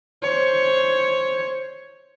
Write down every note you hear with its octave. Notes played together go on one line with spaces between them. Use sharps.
C5 C#5